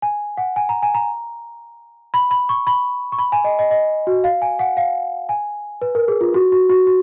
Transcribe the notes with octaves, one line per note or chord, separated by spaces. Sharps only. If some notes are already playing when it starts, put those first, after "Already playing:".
G#5
F#5
G#5
A#5
G#5
A#5
B5
B5
C#6
B5
C#6
B5
G#5
D#5
D#5
D#5
F#4
F5
G#5
F#5
F5
G#5
B4
A#4
G#4
F4
F#4
F#4
F#4
F#4